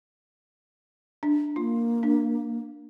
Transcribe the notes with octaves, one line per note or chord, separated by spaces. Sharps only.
D4
A#3 F4
D4